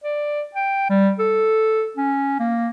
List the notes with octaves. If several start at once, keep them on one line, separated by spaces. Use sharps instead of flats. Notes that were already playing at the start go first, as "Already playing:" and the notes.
D5
G5
G3
A4
C#4
A#3